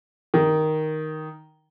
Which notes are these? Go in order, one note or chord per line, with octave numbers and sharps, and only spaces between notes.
D#3